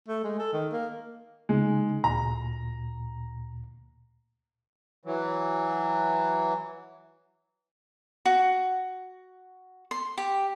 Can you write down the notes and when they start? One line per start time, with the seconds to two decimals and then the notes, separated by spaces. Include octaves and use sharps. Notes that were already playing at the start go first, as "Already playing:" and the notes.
0.08 A3
0.24 G#3
0.39 A4
0.53 D#3
0.72 A#3
1.49 C#3 G#3 D#4
2.04 D2 A#2 A#5
5.05 E3 F#3
8.25 F#4
9.91 C6
10.18 G4